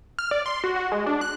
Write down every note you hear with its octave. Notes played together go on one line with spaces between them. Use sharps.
F6
D5
C6
F#4
F#4
G#3
D4
F#6